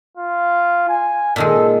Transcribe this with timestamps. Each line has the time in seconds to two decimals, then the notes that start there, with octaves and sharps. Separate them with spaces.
0.17 F4
0.89 G#5
1.36 A#2 D#3 G#3 A4